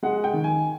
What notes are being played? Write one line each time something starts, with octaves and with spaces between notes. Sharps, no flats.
G#3 F#5
G5
D#3
G#5